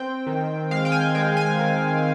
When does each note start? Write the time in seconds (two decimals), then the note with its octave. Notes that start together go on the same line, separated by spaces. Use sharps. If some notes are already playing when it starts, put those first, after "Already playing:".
Already playing: C4 G5
0.27 D#3
0.71 G#3 F5
0.85 G5
0.92 G#5
1.15 G#3 G5
1.37 G#5
1.58 D#3